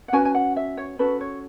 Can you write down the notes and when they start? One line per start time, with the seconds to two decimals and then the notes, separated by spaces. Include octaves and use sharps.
0.08 F#5
0.13 C#4 F#4 B4 G#5
0.25 G#5
0.35 F#5
0.56 E5
0.77 C#5
0.99 C#4 F#4 A4 B4
1.21 C#5